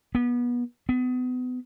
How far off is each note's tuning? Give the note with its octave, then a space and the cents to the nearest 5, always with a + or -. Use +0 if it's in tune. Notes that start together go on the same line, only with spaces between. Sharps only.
B3 -25
B3 +30